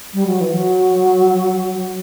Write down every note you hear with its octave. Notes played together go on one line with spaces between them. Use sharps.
G3
F#3
E3
F#3